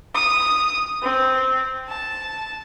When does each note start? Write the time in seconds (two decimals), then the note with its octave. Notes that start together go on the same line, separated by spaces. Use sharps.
0.15 D#6
1.02 C4
1.88 A5